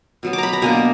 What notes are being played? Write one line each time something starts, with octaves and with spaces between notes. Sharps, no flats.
B2 F#3 B3
D6
A#5 B5
A#5
B2 A#3 D4 G#5